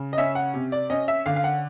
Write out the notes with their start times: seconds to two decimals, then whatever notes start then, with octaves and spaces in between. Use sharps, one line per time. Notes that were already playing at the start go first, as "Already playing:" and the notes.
Already playing: C#3
0.13 D#5
0.18 C#4 E5
0.35 F#5
0.54 C3
0.72 D5
0.90 C#4 D#5
1.08 E5
1.26 D3 F5
1.36 F5
1.44 F#5